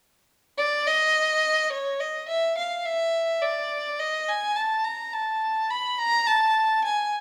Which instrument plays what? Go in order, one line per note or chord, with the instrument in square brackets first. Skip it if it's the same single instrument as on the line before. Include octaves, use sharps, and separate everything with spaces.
[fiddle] D5
D#5
C#5
D#5
E5
F5
E5
D5
D#5
G#5
A5
A#5
A5
B5
A#5
A5
G#5